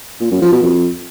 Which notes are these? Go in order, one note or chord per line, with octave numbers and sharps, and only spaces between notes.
A#2
F#2
F3
B2
F2